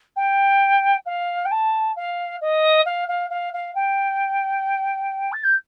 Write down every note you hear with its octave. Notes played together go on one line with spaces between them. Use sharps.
G5
F5
G5
A5
F5
D#5
F5
F5
F5
F5
G5
A6
G6